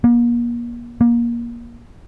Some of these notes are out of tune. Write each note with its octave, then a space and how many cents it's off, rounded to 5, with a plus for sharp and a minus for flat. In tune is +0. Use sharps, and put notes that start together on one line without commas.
A#3 +35
A#3 +20